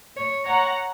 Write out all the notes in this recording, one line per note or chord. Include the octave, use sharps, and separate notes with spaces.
C#5
C#5 F#5 A#5